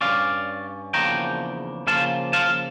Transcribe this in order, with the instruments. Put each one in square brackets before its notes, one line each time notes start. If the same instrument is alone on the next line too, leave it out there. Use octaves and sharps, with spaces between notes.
[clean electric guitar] G2 F3 C#4 D5 F5
E2 C#3 F3 A#3 D4 G5 A#5
C#3 F3 A#3 F5 A5
F5 A5